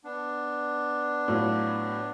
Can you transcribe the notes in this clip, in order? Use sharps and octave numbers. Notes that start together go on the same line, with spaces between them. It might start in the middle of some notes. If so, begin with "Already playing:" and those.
B3 D4
A2 F#3 F4